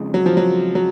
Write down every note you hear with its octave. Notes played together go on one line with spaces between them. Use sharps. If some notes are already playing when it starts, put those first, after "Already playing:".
Already playing: F2 C#3 G#3 D#4
F#3
F3
F#3
F#3